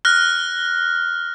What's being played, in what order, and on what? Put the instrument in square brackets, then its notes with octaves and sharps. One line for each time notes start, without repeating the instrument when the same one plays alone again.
[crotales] F6 F#6 A#6